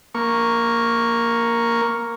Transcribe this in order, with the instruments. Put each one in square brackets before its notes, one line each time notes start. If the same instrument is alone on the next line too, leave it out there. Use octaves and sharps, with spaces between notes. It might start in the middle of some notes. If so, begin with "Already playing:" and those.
[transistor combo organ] A#3 C#6